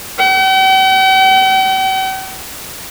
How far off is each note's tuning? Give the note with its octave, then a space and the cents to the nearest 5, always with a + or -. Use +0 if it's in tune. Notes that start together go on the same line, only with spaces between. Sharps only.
G5 -45